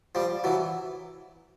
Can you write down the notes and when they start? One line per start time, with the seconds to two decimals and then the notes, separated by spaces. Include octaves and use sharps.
0.15 F3 G3
0.44 E3 F#3